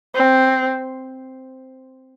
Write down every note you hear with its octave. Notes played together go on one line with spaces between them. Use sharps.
C4